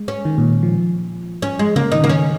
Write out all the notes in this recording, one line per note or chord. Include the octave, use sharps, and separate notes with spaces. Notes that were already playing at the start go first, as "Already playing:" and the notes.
Already playing: G#3
C#4
D#3
A#2
F3
C#4
G#3
C#3 A#3
D#3 D#4
C#3 A#3
C#4